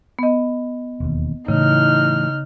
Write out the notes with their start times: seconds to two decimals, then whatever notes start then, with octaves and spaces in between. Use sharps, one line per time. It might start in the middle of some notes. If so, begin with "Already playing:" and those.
0.19 B3 D#5
1.00 E1 D#2
1.48 A2 C#3 E3 D#4 F6